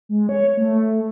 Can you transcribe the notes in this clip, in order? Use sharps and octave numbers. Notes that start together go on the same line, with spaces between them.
G#3
C#5
A3